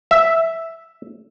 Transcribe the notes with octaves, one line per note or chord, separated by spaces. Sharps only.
E5